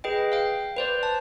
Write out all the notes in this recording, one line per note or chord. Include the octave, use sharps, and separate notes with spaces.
G#4 B4 D#5 G5
F5 G5
B4 C5 D5
A5